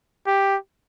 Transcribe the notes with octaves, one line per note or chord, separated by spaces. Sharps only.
G4